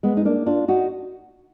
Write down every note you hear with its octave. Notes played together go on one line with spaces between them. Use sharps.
G#3 B3
D#4
A#3 D4
D4 F4
D#4 F#4